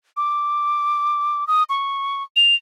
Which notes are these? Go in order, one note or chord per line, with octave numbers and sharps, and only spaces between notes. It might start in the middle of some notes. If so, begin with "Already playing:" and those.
D6
D#6
C#6
F7